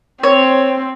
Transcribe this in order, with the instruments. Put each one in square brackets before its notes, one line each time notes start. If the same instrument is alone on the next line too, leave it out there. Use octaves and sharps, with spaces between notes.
[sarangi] C4 [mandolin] C#5